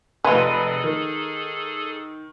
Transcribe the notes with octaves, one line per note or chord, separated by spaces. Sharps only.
F1 G#3 F4 G#4 A4 B4
D#3